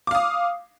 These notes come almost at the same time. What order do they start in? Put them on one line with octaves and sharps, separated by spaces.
D6 F5 D#6